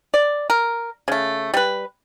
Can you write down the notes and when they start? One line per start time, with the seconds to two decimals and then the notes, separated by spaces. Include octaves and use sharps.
0.14 D5
0.50 A#4
1.08 C#3 A3
1.54 G3 B4